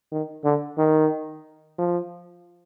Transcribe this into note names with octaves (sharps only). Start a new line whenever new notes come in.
D#3
D3
D#3
F3